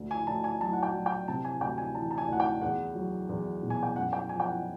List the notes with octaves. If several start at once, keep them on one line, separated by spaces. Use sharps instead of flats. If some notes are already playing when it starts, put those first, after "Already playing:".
Already playing: D2
G#5
D2 A5
G#5
F#3 A5
F#5
G5
F#3
G5
C3 A5
G#5
D2 G5
G#5
E3 A5
A5
G#5
D2 F#5
G5
E2 F#5
F#3
E2
B2
G#5
G5
F#2 F#5
G5
F3 G#5
G5
F#5